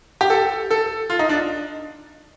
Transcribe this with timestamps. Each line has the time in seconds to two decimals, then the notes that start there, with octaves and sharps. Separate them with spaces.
0.21 G4
0.30 A4
0.71 A4
1.10 F4
1.19 D#4
1.29 D4